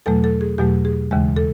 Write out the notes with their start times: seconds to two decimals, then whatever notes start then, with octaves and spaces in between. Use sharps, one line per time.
0.06 E2 B2 F#3 A3 A4
0.24 A4
0.41 G#4
0.58 E2 B2 F#3 A3 G4
0.85 G#4
1.11 D#2 C#3 E3 G#3
1.36 A4